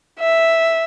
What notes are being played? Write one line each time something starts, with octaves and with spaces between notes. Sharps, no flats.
E5